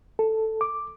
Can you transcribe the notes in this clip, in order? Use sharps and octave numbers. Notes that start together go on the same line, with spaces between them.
A4
D6